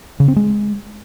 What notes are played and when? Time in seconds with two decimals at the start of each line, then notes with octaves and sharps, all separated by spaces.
0.20 C#3
0.28 C4
0.36 G#3